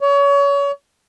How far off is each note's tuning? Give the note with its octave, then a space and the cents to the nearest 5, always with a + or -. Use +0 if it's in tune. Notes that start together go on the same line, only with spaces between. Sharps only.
C#5 +30